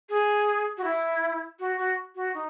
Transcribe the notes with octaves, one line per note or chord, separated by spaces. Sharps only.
G#4
F#4
E4
F#4
F#4
F#4
D#4